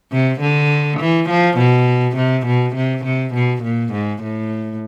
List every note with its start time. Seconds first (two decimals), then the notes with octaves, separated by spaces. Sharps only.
0.12 C3
0.41 D3
1.00 E3
1.29 F3
1.58 B2
2.16 C3
2.46 B2
2.76 C3
3.05 C3
3.34 B2
3.63 A#2
3.93 G#2
4.23 A2